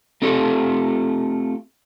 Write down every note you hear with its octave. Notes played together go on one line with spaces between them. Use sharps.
A3 C4 F4 G4 A4